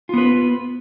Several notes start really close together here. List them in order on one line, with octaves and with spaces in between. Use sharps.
F4 B3 B4